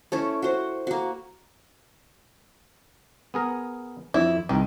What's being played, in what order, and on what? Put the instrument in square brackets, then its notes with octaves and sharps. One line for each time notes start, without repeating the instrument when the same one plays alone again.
[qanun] A3 C#4 E4
F#4 C5
A#3 F#4
[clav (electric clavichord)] B3 G#4 A#4
[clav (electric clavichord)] F2 [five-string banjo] E4
[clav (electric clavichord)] C2 [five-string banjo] D#3